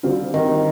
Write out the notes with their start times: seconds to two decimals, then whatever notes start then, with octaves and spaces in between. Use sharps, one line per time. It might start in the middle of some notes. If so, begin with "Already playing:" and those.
0.03 D3 G3 C4 F4
0.34 D#3